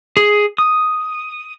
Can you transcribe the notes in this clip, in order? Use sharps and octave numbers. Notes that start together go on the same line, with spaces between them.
G#4
D#6